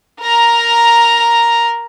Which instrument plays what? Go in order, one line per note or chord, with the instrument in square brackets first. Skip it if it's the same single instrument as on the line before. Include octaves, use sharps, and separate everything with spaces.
[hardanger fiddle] A#4 A#5